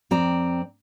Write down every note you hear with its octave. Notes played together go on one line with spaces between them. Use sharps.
F2 C4 D5 A#5